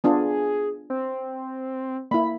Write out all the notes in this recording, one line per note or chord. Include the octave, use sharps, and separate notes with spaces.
B3 D4 F4 G#4
C4
A#3 E4 B5